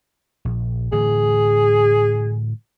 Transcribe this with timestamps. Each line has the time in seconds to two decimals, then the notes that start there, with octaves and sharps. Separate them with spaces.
0.45 A#1
0.92 A2 D3 E3 G#4